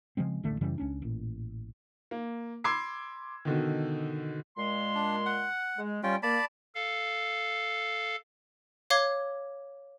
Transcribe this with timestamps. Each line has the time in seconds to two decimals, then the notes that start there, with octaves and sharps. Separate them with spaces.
0.17 C#3 F3 G#3 C4
0.43 D#1 A1 D3 A3
0.61 F#2 C#3 E3 G3
0.78 C#2 C#4 D4
1.02 A1 A#2
2.11 A#3
2.64 B5 C6 D6 E6 G#6 C7
3.45 B2 D3 D#3
4.57 A#2 G#3 C6
4.95 D4
5.26 F#5
5.78 G#3
6.03 G3 C#4 F4 G5
6.23 A#3 D5 A5 B5
6.75 A4 F5
8.90 C#5 F5 D6 G#6 G7